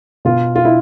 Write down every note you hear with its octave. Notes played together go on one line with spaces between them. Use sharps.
B2 F4
F4
E4